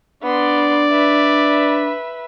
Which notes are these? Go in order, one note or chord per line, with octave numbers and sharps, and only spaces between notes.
B3 D4 D5 C6
B4 E5